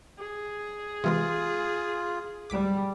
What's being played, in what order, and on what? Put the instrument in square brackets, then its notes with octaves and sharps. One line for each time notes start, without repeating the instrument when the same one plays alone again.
[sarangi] G#4
[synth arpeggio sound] C3 E3 G#3 [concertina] F4
[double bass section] G3 [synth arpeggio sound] D6 B6 D7